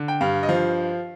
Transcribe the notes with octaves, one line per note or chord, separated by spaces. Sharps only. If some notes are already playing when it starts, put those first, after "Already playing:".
Already playing: D3
G5
G2 F5
D#5
F3 F5